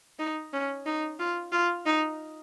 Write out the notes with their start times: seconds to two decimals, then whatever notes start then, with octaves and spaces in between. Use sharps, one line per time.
0.19 D#4
0.53 C#4
0.86 D#4
1.19 F4
1.52 F4
1.86 D#4